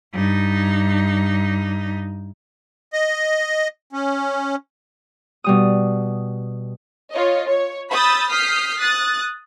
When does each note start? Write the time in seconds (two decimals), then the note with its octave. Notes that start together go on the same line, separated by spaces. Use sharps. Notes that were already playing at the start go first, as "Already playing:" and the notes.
0.13 G2 D#4
2.93 D#5
3.93 C#4
5.44 B2 G3 D#6
7.11 F4 C#5 D#5
7.47 C#5
7.91 B5 D#6 E6 G6 A6
8.29 D#6 F6 G6 B6 C7
8.80 D#6 F#6 A6